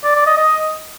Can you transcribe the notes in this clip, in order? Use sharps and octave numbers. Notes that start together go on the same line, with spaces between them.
D5
D5
D#5
D#5